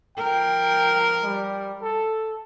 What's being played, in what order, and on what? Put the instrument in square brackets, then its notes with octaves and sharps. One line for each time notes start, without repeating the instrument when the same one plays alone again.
[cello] F3 A#4 [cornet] G5
[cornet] G3
A4